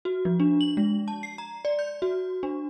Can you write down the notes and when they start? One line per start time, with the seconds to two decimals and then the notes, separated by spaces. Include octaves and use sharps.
0.05 F#4
0.25 F3
0.40 D4
0.61 F#7
0.77 G#3
1.08 A5
1.23 C7
1.38 A#5
1.65 D5
1.79 G6
2.02 F#4
2.43 D4